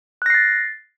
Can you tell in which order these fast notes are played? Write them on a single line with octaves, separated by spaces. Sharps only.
F#6 A#6 C7 A6